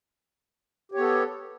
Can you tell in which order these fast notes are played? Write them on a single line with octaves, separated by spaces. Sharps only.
G4 C#5 B3 A4